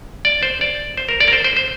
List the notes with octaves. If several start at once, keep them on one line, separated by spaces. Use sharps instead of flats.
D5
C5
D5
C5
A#4
D5
A#4
C5
C5
C5